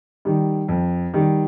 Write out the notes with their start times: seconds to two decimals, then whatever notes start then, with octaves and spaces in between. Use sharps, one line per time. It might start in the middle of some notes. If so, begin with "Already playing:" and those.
0.25 D#3 G3
0.68 F2
1.14 D#3 G3